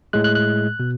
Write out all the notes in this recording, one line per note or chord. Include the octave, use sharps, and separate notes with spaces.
A2 G#3 F#6
F#6
F#6
B2